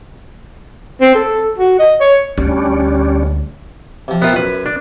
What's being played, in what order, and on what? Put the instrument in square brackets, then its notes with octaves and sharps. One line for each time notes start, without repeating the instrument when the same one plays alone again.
[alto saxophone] C4
A4
F#4
D#5
C#5
[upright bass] D2 [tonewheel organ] G3 C#4 D4
[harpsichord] C3 F3
[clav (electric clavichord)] B3 F4 [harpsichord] C4 A#4 E5
[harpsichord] F#2 [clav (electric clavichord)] B4
[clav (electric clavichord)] D4